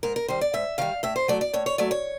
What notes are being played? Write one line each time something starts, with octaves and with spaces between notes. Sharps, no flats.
G#2 A#4
A#4
D#3 G3 C5
D5
G#2 E5
D#3 G3 F5
A2 E5
C5
F#3 A3 D5
D5
A2 C#5
C#5
F#3 A3 D5
C#5